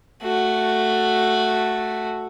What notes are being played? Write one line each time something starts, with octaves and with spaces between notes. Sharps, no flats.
A3 F#4